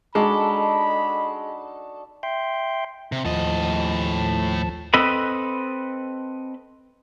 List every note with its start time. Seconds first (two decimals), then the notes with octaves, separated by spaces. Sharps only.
0.15 G#3 D4 D#4 F#4 A4 B5
2.23 E5 G5 C6
3.12 C3
3.25 D#2 A2 F3 D#5 A5
4.94 C4 A4 B4 D#5 B5